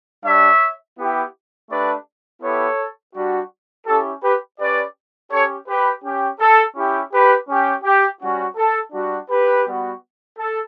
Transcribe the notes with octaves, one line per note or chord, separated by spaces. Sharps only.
G3 D4 G4 C#5 E5
B3 E4 G4
A3 D4 G4 B4 D5
B3 E4 G4 A4 C#5
G3 D4 F#4
C#4 E4 G4 A4
G4 B4
C#4 G4 B4 D5
C#4 G4 A4 C#5
G4 B4
C#4 G4
A4
C#4 E4 G4
G4 B4
C#4 G4
G4
G3 C#4 F#4
A4
G3 D4 F#4
G4 B4
G3 B3 F#4
A4